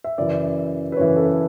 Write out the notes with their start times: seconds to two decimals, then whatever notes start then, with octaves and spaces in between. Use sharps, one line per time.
0.04 E5
0.18 F#2 C#3 E3 D5
0.92 B4
0.97 F#2 C#3 E3 C#5
1.16 A4
1.26 B4